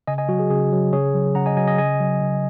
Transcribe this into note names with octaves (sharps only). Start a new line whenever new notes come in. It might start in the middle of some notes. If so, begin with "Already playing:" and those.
C#3 D#5 G#5
D#5 G#5
F#3 F#4
G#4
C#3 G#4
F#3
C#3 G#4 C#5
F#3
C#3 F#5 A#5
D#5 G#5
F#3 D#5 G#5
D#5 G#5
C#3 D#5 G#5
F#3
C#3